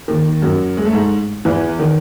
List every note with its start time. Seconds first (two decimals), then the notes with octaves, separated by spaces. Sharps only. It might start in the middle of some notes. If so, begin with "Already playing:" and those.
0.08 D#2 D#3
0.42 F#2 F#3
0.77 G#3
0.85 A3
0.93 G#2 G#3
1.45 E2 E3
1.79 D#3